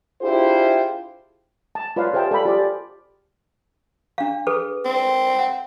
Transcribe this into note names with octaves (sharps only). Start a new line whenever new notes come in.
D4 E4 F4 G4 G#4 C5
A5
F4 B4 C#5 D5 F5
G4 G#4 C5 E5 G5 A5
A4 D5 F5 B5
F4 G4 G#4 C5 D5
D4 F5
G#4 A4 B4
C4
F#5